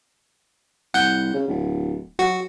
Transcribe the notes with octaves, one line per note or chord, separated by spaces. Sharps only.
C2 F#5 G6
C#3
D1
F#3 F#4